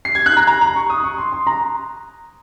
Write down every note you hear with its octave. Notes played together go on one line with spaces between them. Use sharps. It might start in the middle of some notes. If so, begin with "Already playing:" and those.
C7
G#6
F#6
A#5
A#5
A#5
C#6
D#6
C#6
C6
C6
A#5